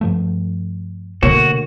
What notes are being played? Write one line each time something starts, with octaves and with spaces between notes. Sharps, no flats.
G2 F3 A3
D2 B2 D3 A#3 F#4 C#5